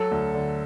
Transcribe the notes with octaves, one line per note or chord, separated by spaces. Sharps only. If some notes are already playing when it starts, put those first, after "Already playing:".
Already playing: F#3 A4
D2
D3